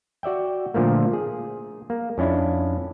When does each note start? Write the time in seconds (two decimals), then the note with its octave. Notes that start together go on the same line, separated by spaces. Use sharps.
0.23 F#4 D5 E5 G5
0.74 A#2 D3 F3 A3 A#3
1.13 G#4
1.90 A#3
2.18 F2 C#4 D4 E4